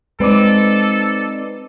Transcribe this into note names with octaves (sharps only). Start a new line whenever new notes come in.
G#3 C4 D#4 A4 B4 D5 D6